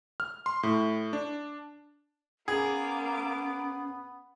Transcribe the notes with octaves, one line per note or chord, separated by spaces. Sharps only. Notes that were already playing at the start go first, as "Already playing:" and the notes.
F6
C6
A2
D4
A#3 B3 C#4 G#4 D6